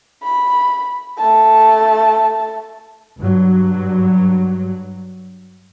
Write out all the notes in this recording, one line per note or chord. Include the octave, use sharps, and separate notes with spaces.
B5
A3 A5
G2 F#3